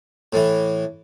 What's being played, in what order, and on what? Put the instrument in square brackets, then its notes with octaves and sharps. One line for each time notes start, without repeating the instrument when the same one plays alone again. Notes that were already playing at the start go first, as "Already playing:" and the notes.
[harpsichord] A2 E3